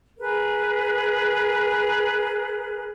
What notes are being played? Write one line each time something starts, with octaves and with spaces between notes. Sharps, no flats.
G#4 A#4 B4